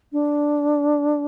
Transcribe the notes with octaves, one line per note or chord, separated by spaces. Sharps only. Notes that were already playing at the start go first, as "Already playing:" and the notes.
D4